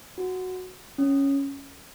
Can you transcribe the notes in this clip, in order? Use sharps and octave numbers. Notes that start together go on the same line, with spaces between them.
F#4
C#4